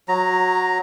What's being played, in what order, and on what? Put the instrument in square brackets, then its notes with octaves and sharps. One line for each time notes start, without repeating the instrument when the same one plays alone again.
[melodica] F#3 A#5